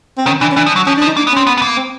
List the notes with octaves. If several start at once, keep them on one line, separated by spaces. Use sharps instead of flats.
C4
D#3 C#4
E3 D4
C#4
E3 D4
F3
F#3
F3 C#4
D4
F3
D#4
A#3 D4
B3
C4 C#4
B3
B3
A#3
C4